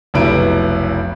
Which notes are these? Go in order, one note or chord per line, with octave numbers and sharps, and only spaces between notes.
F1 B1 E4 B4 D7